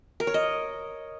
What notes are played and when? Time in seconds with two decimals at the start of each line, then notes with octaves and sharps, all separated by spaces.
0.20 A#4
0.27 C#5
0.34 D#5